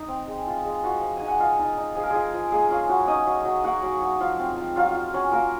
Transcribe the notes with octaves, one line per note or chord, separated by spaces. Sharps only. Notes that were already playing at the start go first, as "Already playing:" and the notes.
Already playing: D#4
C4
G#3
F4
G#3
F3 F#4 F#5
F3
D#4 G#5
F#5
D#4 F4 F5
D#4
D#4
F3 G#4
A#4
F3 G#3 G#4
F3
G#3 A#3 G#4
C#4 F4
F#3 F#4
C#4 D#4 D#5
F#3
F#3
A#3 F#4 F#5
F#3
F#3
F3 F4 F5
C4
F3
F#3 F4 F5
F4
F#3 C#4 C#5
A#3 F4 A#4